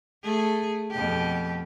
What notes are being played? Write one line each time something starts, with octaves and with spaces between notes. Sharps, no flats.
A3 G#4
F2 B2 G4